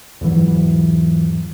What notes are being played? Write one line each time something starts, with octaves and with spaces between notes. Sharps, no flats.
E2 G#2 E3 F#3